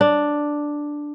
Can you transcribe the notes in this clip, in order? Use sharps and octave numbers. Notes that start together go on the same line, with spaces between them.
D4